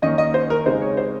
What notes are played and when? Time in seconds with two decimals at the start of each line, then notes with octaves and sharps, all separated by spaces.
0.02 D#3 A#3 C#4 D#5
0.18 D#5
0.34 C5
0.50 A#4
0.66 C#3 G#3 C4 D#4 C5
0.82 C#5
0.97 C5